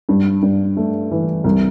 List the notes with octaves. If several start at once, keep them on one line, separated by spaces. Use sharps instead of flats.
G2
G2
A3
E3
C2